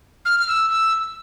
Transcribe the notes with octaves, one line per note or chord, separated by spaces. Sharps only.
F6
F6
E6
E6